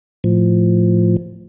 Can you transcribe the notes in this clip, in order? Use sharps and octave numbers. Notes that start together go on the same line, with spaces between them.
A2 F3